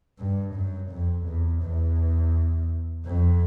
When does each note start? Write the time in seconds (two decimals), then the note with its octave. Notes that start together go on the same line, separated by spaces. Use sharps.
0.19 G2
0.55 F#2
0.91 F2
1.27 E2
1.62 E2
3.06 F2